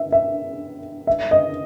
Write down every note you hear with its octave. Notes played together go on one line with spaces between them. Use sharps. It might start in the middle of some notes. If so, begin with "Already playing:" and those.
Already playing: E5
E5
E5
D#5